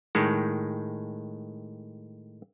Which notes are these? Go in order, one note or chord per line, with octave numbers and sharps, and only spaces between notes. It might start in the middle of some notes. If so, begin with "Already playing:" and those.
A2 D#3 G#3